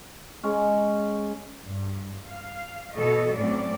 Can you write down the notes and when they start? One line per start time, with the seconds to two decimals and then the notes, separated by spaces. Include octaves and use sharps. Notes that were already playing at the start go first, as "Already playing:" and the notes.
0.43 G#3 C#4
1.63 G2
2.26 F5
2.95 B2 E3 A4 C#5 D#5
3.35 A2 F#3 C4 C#4 D5